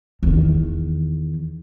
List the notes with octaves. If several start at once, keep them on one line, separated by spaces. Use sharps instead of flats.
E2 D#3